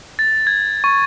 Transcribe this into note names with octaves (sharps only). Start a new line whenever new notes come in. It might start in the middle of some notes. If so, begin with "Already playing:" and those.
A6
G#6
C#6